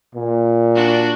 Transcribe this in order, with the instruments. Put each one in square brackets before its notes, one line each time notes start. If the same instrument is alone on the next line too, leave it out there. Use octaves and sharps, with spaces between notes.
[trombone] A#2
[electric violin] D4 F#4